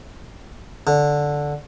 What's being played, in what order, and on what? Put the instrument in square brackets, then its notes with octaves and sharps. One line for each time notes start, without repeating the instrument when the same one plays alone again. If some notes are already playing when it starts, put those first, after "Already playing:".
[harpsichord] D3